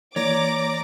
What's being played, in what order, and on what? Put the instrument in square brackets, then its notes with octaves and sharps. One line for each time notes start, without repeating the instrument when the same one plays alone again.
[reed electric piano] E3 A#3 [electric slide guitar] C#5 [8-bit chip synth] D5 A#5 A#6 [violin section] D6